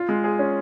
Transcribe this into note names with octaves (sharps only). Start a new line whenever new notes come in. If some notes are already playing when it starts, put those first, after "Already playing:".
Already playing: F4
G#3
G#4
C#4